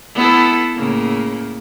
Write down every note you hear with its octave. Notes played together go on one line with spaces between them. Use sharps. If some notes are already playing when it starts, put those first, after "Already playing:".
B3 E4 A4
A2 C#3 A#3